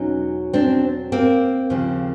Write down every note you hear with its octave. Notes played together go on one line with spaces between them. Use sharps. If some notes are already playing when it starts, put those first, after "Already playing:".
Already playing: E2 B2 F#3 C#4 D#4
C4 D4
A#3 C4
D#2 C#3 F3